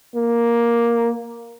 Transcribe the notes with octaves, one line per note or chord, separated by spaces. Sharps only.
A#3